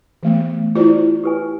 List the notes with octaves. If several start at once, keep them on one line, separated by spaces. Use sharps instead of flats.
E3 A3 B3
E4 F4 G4 C5 D5
G4 B4 G#5